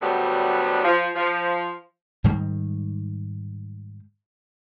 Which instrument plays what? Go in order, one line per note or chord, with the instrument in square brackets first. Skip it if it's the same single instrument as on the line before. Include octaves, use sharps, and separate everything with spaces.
[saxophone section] D2 F#3 G3 B3 D4
F3
F3
[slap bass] G#2 D#3 G3 G#3